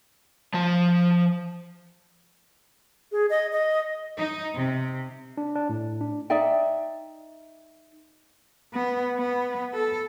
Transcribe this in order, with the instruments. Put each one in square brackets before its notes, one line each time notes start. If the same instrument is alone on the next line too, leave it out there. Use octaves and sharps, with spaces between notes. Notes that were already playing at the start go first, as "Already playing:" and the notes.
[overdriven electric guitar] F3 A5
[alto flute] G#4
D#5
D#5
[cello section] D#4
C3
[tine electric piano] D4
D4
A2
D4
[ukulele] D#4 D5 E5 G5
[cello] B3
B3
A4